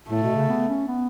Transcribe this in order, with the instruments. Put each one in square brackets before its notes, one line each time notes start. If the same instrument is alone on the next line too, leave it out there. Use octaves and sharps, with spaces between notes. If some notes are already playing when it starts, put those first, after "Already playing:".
[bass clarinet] A2 [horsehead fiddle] A3
[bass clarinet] B2
C#3
B3
C#4
B3